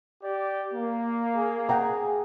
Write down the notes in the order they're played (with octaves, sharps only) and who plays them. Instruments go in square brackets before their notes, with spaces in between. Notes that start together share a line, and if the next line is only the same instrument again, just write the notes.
[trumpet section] G4 D5
A#3
[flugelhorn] G#4
[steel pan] F#5 G5 A#5